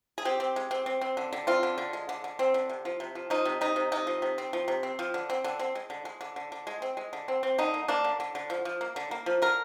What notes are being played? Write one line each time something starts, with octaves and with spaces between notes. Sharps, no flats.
G#4
C4 G4
C4
G#3
C4
C4
C4
D3
D3
C4 F4
D3
D3
G#3
D3
D3
C4
D3
C3
F3
C3
F3
F3 D#4
C3
C3 D#4
C3
C3 D#4
F3
C3
C4
F3
C3
C4
F3
D3
C4
D3
C4
G#3
D3
G#3
D3
D3
D3
G#3
C4
G#3
D3
C4
C4
D3 D#4
A#3
A#3 D4
D3
D3
D3
F3
F3
A#3
D3
A#3
F3
D3 A#4